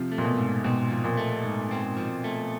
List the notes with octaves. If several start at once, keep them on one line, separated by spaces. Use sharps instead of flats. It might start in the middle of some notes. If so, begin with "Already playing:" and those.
Already playing: C3 F3
A3
A#2
B2
G#2
B2 C4
F3
A#2
A3
G#2
C4
F3
A3